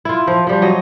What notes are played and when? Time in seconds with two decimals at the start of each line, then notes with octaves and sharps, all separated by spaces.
0.05 E4 F4
0.27 F3
0.47 F3 G3
0.62 F#3 D#5